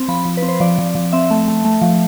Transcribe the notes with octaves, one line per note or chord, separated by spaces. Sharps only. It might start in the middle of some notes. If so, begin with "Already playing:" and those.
Already playing: C4
F3 B5
F3
B4
C4
C5
F3 D5
F3
F3
C4 E5
A3
A3
A3
F3